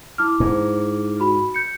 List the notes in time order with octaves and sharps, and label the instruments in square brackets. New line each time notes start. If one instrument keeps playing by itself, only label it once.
[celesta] E4 D6 F6
[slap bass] G#2
[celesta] F#4 B5
G6 C#7